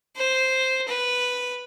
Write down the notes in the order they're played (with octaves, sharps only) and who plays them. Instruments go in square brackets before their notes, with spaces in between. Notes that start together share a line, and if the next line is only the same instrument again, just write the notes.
[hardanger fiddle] C5
B4